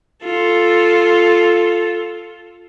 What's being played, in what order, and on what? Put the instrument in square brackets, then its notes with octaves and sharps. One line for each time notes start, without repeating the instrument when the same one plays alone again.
[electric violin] F4 A4